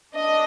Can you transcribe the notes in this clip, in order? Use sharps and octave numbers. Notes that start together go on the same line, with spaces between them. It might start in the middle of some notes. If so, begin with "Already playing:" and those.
D4 D#5